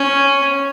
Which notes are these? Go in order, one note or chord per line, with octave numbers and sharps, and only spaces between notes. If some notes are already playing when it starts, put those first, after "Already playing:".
Already playing: C#4